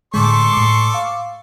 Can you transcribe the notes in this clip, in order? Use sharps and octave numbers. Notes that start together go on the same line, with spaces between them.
A2 D3 G#3 A4 D5 C6 C#6
A2 D6
F5 D6